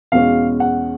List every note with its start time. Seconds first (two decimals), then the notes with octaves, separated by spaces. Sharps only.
0.12 E2 B2 G#3 C#4 F5
0.60 F#5